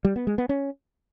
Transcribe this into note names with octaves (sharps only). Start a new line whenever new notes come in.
G3
B3
G#3
B3
C#4